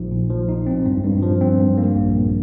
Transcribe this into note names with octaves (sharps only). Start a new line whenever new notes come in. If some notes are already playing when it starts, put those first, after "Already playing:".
Already playing: A#1 F3 D#4
A#2
F3
D#4
C4
G2
G2
F3
C4
G2
A#3
A#1
A#1